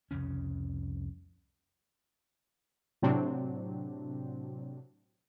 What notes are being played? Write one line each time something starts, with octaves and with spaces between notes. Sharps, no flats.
C2 F2 C#3 C#4
A2 C3 F#3 C4 D4